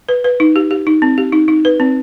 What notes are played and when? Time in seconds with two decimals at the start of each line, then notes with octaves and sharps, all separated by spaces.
0.09 B4
0.24 B4
0.40 D#4
0.56 G4
0.71 G4
0.87 D#4
1.02 C4
1.18 G4
1.33 D#4
1.48 D#4
1.65 B4
1.80 C4